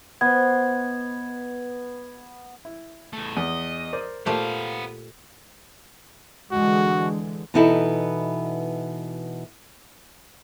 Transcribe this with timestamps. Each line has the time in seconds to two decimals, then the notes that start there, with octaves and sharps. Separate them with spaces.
0.21 B3 C5 D#5 G#6
2.65 E4
3.13 E2 A3
3.37 E2 D#5
3.93 A#4 C5 D5
4.26 A#2 A3 B3 G4 C5 F5
6.52 D3 E3 G#3 F#4
7.54 B2 E3 B3 D#4 E4 A4